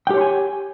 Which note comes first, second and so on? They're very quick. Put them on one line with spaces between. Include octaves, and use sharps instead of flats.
G5 G4 C#5 C6 G#5